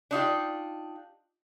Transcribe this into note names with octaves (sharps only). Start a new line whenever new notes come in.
D4 D#4 F4 G4